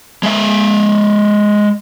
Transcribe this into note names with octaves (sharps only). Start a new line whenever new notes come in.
G#3 E5